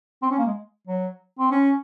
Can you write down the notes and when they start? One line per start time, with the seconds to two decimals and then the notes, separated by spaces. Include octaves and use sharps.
0.23 C4
0.31 C#4
0.39 A#3
0.47 G#3
0.87 F#3
1.39 C4
1.51 C#4